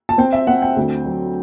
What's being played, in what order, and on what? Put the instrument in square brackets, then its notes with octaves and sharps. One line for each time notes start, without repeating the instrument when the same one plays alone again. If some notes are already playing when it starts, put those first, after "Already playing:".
[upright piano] A5
C4 G5
E5
C4 F#5
G5
D2
F#3